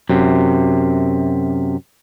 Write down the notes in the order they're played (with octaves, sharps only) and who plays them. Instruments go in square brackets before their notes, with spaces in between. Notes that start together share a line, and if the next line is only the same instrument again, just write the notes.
[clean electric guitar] F#2 C3